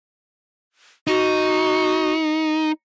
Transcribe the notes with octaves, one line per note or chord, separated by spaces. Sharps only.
D#4 F#4